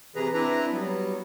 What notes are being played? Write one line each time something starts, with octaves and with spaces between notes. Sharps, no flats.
C3 E3 G#4 B4 A#5
C4 D4 E4 B4 A#5
F#3 G3 B3